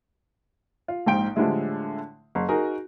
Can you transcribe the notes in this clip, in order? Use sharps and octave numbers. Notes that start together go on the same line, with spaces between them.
F4
A#1 G#2 G5 D7
A2 D3 F3 G3 G#3 E4
F#1
D#4 F#4 G#4 A#4